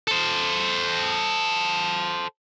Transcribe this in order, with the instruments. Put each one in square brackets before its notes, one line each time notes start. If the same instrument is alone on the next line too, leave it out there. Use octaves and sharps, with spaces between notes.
[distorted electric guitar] A4 C5